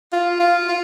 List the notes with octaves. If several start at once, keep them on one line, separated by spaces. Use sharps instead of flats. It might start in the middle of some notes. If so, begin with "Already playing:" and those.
F4
F4
F4